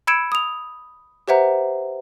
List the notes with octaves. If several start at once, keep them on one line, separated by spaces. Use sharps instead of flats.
B5 E6 G#6 C#7 D7 E7
D#6 F7
G4 B4 C5 E5 F#5 A#5